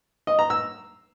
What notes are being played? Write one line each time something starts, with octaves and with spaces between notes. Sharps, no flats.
D#5
A#5
E6